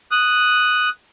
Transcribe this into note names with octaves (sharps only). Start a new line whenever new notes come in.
D#6 F#6